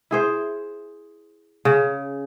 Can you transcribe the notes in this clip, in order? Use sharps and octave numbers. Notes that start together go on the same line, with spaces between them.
E4 G#4 C5
C#3